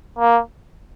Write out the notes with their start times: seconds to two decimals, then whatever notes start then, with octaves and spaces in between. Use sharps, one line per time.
0.19 A#3